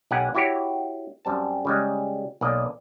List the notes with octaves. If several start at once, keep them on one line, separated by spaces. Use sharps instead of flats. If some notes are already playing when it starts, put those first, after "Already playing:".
B1 G4 F#5 G#5
E4 F#4 G4 C#5
F#2 G3 C4 A5
C#3 G3 G#3
B1 A#3 D5 D#5